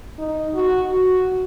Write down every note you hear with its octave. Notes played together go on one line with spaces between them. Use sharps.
D#4
F#4
F#4